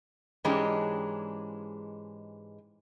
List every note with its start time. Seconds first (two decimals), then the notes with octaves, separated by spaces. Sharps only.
0.44 G#2 E3 G#3 C#4 D4 G4